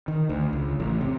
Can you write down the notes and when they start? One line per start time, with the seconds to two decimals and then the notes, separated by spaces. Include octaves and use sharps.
0.08 D#3
0.29 D2
0.53 C#2
0.80 A1
1.01 C3